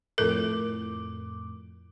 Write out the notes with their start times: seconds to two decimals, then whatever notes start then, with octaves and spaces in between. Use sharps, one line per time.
0.18 F2 A2 A4 A#4 D6